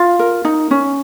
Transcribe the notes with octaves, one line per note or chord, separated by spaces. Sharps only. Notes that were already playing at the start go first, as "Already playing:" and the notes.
Already playing: F4 F5
A#4
D#4
C#4